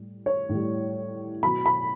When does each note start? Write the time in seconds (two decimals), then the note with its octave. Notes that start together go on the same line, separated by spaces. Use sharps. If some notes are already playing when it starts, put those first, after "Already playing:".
Already playing: A2 G3
0.26 C#5
0.49 A2
0.54 G3
1.43 B2 F#3 B5
1.66 B5